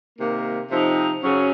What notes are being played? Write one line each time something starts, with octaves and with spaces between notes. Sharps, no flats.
C3 D#3 A#3
C3 F3 C4 D#4
F#2 C#3 F#3 C#4